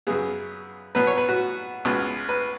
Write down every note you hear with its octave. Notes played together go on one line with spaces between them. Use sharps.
F#2 C#3 B3 G#4
B2 F#3 B3 B4
C#5
B4
F#4
C#2 B2 B3
B4